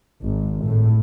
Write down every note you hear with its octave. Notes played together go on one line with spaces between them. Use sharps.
G#1
A2